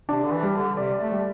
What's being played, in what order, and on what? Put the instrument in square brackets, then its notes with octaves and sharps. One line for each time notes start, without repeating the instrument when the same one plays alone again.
[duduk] C3 [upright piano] D4
[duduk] D3
E3
[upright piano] G3
[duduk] D3
[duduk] C3 [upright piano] D5
[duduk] A3
[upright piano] G3